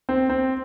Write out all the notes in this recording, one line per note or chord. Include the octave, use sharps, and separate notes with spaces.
C4
C4